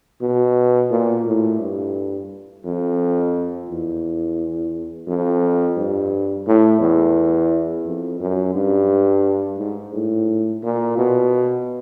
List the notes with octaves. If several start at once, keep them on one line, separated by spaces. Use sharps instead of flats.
B2
A#2
A2
G2
F2
E2
F2
G2
A2
E2
F2
F#2
G2
G#2
A2
A#2
B2